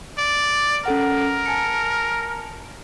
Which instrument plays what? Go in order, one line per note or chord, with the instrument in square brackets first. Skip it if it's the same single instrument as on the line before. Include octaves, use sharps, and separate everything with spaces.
[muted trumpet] D5
[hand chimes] C#4 A4 F#5 [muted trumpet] A#4
[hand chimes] G#5 A5 C#7